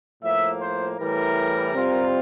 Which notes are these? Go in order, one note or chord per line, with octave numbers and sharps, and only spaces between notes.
A2 F3 A#3 E5
C5
A2 E3 G3 A#4
C3 G3 C4 F4